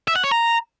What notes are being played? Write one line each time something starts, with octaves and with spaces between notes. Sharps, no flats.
E5
F#5
C#5
A#5